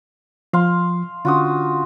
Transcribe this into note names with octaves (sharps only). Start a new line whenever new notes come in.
F3 F5 C6
D3 C#4 D4 F4 F#4 D#6